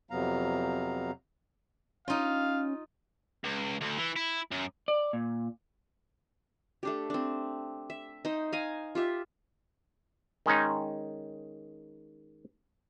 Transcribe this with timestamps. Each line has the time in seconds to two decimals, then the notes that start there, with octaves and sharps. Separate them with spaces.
0.11 F2 C3 F#3 B3 F5 A#5
2.08 C#4 D#4 F4 F5
3.44 C#2
3.81 D2
3.98 E3
4.16 E4
4.51 F#2
4.88 D5
5.13 A#2
6.83 A3 D4 G4
7.10 C4 D4
7.90 E5
8.25 D#4 C5
8.53 F5 G#5 A#5
8.95 F4 G4 E5
10.46 D#3 G#3 C#4 D#4